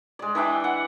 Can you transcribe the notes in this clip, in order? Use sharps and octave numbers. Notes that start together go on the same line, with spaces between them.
G#3 D5
E3 D4 E5 G5
F#5